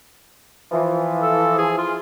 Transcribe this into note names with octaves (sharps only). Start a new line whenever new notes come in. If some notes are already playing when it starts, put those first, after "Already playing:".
E3 F3
A4
G#4
F4